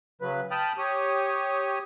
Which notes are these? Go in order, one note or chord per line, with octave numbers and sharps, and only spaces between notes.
C#3 F#3 B4
G5 A5 B5 D#6 F6
G4 C#5 D#6